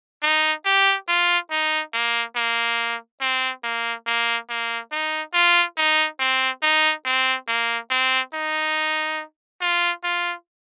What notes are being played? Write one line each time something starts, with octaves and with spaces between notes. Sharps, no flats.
D#4
G4
F4
D#4
A#3
A#3
C4
A#3
A#3
A#3
D#4
F4
D#4
C4
D#4
C4
A#3
C4
D#4
F4
F4